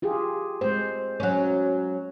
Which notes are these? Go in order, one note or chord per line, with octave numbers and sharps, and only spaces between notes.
F4 G4 G#4
G#3 C4 C5
F#3 C#4